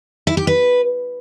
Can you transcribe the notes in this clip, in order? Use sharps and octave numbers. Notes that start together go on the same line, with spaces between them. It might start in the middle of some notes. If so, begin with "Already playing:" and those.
E4
G4
B4